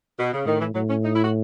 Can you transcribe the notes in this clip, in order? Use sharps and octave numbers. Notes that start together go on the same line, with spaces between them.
B2
C#3
A2 D#3
E3
A2 F#3
C#4
D#4
E4
F#4